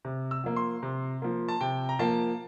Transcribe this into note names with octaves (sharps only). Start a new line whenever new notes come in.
C3
E6
F3 A#3
C6
C3
F3 A#3
A5
C3 G5
A#5
F3 A#3 A5